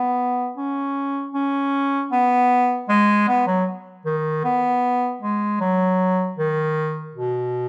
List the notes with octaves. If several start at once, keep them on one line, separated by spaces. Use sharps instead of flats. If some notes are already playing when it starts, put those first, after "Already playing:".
Already playing: B3
C#4
C#4
B3
G#3
B3
F#3
D#3
B3
G#3
F#3
D#3
B2